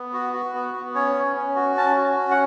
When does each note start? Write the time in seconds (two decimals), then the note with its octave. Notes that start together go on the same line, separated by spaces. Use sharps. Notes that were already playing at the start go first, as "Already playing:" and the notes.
Already playing: B3
0.13 F#4
0.33 F#4
0.54 B3
0.74 B3
0.95 C#4 C#5
1.15 C#4
1.36 C#4
1.56 F#4
1.77 C#4 A5
1.97 F#4
2.17 C#4
2.31 F#5